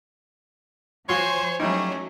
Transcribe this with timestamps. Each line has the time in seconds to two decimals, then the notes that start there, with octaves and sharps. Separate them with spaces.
1.09 F3 F4 F#4 C5 C#5 G#5 C6
1.60 F#3 G3 A3 C#4 D#4 E4